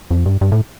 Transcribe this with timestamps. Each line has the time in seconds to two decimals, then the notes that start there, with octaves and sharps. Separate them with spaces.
0.11 F2
0.26 G2
0.41 G2
0.52 A2